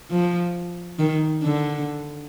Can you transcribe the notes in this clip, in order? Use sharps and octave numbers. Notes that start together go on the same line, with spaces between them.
F3
D#3
D3